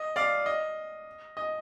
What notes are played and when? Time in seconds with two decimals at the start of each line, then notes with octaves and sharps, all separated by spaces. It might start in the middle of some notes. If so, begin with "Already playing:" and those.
Already playing: D#5
0.16 D5 F5
0.46 D#5
1.37 D#5